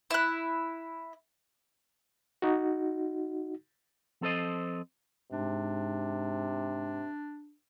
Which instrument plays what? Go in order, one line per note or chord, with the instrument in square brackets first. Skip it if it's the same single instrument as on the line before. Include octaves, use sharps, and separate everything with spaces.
[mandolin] E4 F#6
[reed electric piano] D#4 F#4
[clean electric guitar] F3 C4 A4 C5 D#5
[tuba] G#2 [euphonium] C3 [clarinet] D4